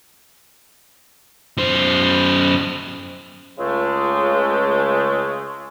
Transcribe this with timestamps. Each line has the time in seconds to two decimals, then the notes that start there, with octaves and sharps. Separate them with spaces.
1.57 F#2 C5
3.58 C#2 C#3 G#3 A3